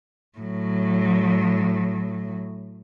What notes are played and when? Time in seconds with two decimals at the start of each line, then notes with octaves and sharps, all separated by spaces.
0.38 A2 F#3